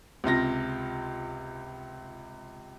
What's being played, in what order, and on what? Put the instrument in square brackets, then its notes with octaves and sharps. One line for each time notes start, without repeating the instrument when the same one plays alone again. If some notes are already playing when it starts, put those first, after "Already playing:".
[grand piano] C#2 C3 F4 A#6